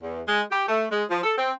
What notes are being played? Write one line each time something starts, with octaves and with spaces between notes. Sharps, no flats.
E2
G#3
G4
A3
G#3
F3
A4
C4